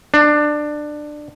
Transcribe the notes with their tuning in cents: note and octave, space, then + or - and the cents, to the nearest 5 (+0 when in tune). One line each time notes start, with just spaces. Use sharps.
D4 +20